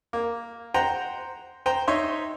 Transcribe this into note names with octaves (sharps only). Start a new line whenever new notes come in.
A#3
C5 F#5 G5 A#5
C5 G5 A#5
D#4 C#5 E5 C6